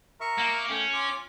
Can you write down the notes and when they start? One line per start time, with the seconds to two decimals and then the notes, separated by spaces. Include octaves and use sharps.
0.21 A#4 E5 C#6
0.38 A#3
0.69 A3 C#4 G5
0.93 F4 D6